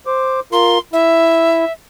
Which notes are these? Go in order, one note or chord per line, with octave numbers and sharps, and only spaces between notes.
C5 D6
F4 A#4 C6
E4 E5